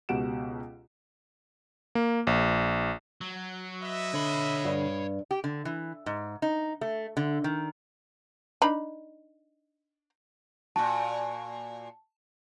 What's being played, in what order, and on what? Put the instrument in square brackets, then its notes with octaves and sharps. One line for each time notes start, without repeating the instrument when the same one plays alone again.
[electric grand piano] C#2 B2 G4 F#5 D7 E7
A#3
A#1
[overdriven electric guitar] F#3
[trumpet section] B4 D#5 E5
[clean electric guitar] D3 [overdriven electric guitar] C#5 B5
[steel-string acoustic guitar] G2
[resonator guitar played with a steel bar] G4
D3
E3
G#2
D#4
A3
D3
D#3
[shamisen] D4 D#4 B5
[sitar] A#2 F#4 [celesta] A5